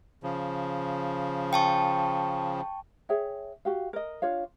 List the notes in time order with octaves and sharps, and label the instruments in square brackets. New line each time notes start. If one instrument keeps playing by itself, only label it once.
[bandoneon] C#3 F3
[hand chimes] G5 A5 C#6
[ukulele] G#4 C#5 E5 G5
F#4 G4 F5
A#4 D#5
D4 F4 C#5 F5